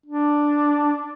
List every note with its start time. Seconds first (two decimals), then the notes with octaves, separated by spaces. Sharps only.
0.06 D4